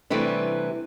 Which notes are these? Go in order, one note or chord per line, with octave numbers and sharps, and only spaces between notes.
C3 E3 G3 A3 D4